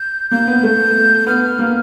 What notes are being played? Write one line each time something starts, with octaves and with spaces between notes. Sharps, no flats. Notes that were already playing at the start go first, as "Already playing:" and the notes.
Already playing: G6
A#3 G6
B3
A3
B3 F6
A#3